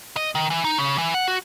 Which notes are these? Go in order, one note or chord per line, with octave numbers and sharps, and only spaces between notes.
D#5
D#3
E3
D#4
C#3
E3
F#5
F#4